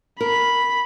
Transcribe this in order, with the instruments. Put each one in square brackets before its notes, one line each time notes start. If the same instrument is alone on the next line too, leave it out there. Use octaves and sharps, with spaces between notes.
[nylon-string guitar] A#4 [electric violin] B5